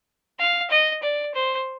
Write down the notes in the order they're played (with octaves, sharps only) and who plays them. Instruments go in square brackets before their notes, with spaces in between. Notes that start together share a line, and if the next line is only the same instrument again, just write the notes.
[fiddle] F5
D#5
D5
C5